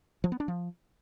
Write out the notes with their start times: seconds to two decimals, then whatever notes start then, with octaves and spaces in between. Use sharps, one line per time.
0.24 F3
0.32 B3
0.40 D4
0.48 F3